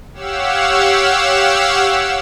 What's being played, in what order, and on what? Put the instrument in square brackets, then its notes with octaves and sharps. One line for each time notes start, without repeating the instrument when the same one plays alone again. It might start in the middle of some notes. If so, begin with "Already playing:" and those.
[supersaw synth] G4 C#5 F5 F#5 E6